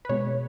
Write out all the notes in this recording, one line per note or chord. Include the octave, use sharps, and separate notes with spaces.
B4
B2 G#3 B3 C#5